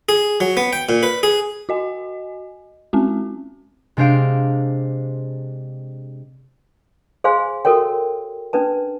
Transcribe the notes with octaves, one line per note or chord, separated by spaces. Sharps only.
G#4
F#3
B3
G5
A#2
B4
G#4
F#4 D#5 G#5
G#3 C4 C#4 F#4
C3 G#3 D4 C5 F5 D7
G#4 C5 F5 G#5 C6
F#4 A4 A#4 C#5 G5
C#4 D4 B4 A5